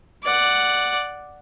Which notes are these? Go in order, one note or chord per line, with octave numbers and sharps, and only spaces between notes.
D5 F#5